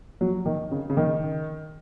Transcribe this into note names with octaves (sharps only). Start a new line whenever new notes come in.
F#3
D#3
C#3
C#3
D#3